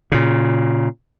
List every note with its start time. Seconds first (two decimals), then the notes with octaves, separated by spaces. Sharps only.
0.12 A#2 C#3